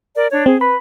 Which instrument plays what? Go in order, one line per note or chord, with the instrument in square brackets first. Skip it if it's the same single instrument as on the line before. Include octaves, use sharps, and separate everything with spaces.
[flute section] A#4 D5
D4 C#5
[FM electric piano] C4 [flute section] G#4
[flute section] B4 [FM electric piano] B5